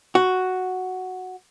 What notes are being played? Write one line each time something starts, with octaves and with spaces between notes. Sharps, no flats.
F#4